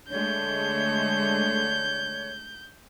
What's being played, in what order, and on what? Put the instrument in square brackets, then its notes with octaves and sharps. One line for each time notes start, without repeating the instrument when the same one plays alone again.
[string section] D3 G#3 A3 [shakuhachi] C#5 [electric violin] G6